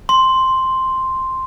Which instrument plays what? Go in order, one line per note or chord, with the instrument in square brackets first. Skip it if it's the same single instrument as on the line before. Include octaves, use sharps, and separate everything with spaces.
[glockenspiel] C6